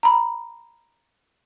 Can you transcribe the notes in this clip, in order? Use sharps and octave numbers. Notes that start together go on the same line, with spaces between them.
A#5 B5